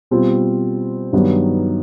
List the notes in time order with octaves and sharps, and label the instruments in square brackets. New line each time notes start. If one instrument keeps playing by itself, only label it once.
[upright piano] B2 G3 C4 F4
G2 D#3 F#3 B3 D#4